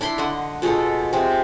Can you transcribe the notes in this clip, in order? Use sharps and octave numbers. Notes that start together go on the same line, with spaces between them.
D4 E4 B5 C6
D3 D#5 F#5
B2 G#3 F4 A4
C3 G#3